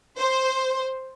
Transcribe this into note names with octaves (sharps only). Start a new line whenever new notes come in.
C5